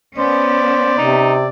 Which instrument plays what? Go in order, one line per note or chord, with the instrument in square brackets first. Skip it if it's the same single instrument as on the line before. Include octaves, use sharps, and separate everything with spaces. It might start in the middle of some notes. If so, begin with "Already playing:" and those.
[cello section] B3 C#4 [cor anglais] C5 [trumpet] D5
[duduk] C3 [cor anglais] D#4